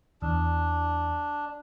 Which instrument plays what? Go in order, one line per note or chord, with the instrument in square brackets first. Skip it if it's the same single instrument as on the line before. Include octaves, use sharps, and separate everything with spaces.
[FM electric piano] E2 [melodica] D4